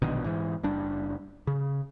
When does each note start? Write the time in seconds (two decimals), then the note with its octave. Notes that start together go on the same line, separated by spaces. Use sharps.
0.02 A#1 B2 D3 D#3
0.24 G#2 E3
0.63 F#1 G3 D4
1.47 C#3